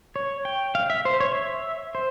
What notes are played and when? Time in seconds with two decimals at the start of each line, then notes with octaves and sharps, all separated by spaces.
0.16 C#5
0.45 G5
0.75 F5
0.90 E5
1.05 C5
1.20 C#5
1.35 E5
1.95 C5